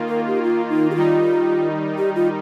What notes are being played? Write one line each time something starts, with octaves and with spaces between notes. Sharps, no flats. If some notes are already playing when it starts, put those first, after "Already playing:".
Already playing: D#3 A#3 F4
A#4
G4
F4
D#4
G4
D#3 G3 D#4 F4
G4
F4